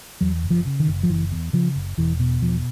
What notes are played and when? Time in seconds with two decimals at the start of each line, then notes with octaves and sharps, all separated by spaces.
0.21 E2 F#3
0.43 F#1
0.51 F3
0.66 C#3
0.80 D#3
0.88 F#1
1.03 F3
1.09 F#1 E3
1.31 E2
1.53 C#3 F3
1.76 F#1
1.98 E1 E3
2.20 B2
2.42 E1 F3